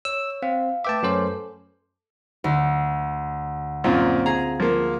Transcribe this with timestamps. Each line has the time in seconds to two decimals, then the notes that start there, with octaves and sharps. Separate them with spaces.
0.05 C#5 E6
0.42 C4 F5
0.84 A3 B4 E5 G5 A5 D6
1.03 F#2 C#4 A4 C5
2.44 D2
3.84 F#2 A#2 C4 F4
4.26 G#4 A#5
4.60 F3 A#3